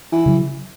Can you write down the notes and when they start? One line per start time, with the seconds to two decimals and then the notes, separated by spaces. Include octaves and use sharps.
0.12 E3
0.26 C#3 F#3